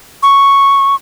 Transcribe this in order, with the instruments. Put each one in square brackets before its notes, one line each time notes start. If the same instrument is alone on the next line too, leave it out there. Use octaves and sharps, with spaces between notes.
[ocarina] C#6